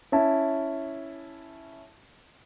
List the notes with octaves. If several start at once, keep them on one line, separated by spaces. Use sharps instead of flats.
C#4 E4 A5